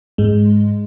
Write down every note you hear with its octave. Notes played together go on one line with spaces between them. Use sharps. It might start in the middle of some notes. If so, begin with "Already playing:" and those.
G#2 G#3